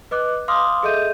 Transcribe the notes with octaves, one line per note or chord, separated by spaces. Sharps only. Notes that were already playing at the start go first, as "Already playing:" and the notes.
B4 D#5 D6 F#6
F5 C6 D6 D#6 F6
G#4 A4 D#5 E5 G6 D#7